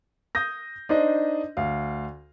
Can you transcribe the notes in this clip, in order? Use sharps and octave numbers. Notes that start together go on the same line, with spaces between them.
D#6 G6 A#6
D4 D#4 C5 D#5
D2 F5